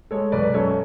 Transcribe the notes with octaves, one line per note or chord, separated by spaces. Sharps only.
G#3 A4 C#5
B1 B4 D5
B4
F#2 A4 C#5